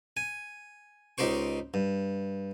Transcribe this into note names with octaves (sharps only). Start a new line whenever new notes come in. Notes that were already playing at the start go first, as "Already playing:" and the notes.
G#5
C#2 D#4 G4 C5 C#6
G2